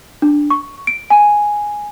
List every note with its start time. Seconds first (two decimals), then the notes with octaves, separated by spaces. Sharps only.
0.22 D4
0.50 C#6
0.87 D7
1.10 G#5